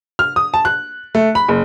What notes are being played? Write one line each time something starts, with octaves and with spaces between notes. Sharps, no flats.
F6
D#6
A5
F#6
A3
B5
F#1